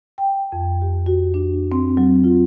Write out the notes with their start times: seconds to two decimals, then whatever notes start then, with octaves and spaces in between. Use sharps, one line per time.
0.18 G5
0.52 F2
0.82 G4
1.06 F#4
1.34 D4
1.72 C4
1.97 F#3
2.24 F4